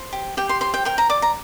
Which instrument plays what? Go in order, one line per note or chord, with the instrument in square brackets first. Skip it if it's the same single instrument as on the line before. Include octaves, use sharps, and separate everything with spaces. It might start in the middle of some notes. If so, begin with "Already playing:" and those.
Already playing: [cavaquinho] C5
G4
G4 G5
C6
C5 C6
G5
A#4 G5
A#5
D5 D6
A#5